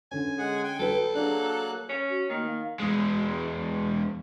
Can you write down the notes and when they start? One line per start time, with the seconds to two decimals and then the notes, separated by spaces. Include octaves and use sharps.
0.12 D3 C#4 G#5
0.38 G#3 G#4 F#5
0.64 G5
0.79 F#3 A4 B4
1.15 F#3 A#3 D4 G#4 D5 F#6
1.89 C#4
2.09 F#4
2.30 D#3 A#3
2.46 F5
2.80 E2 G#3